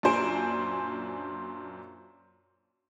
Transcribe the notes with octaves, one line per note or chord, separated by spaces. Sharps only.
F#2 A#2 D4 C5 G#5 D7